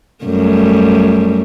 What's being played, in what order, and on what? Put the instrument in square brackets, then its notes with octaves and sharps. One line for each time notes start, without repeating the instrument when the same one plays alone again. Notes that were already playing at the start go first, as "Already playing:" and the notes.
[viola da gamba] F#2 G3 A3